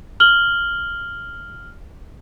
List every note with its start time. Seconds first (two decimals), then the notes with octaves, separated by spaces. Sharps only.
0.20 F6 F#7 G7